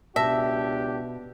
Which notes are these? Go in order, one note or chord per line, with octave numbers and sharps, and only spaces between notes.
C#2 B2 D4 G4 E5 A5 A#6